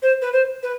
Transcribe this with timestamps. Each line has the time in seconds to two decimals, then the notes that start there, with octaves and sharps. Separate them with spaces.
0.02 C5
0.21 B4
0.32 C5
0.62 B4